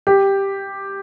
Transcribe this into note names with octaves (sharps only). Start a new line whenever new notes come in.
G4